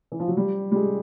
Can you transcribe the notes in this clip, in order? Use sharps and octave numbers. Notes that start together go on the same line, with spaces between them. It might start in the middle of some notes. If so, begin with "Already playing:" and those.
E3
F3
F#3
G3
G3
G#3